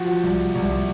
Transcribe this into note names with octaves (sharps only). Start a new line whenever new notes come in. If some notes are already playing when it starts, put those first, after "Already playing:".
Already playing: F3 F#4
C2
C2